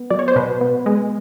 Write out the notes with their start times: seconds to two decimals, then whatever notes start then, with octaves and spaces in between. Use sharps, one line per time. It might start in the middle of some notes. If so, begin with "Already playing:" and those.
Already playing: B3
0.10 F#3 D5
0.19 C#5
0.28 C5
0.36 B2 B4
0.61 B3
0.86 G#3